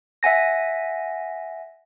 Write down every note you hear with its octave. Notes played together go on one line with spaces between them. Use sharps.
E5 F#5 G#5 A#6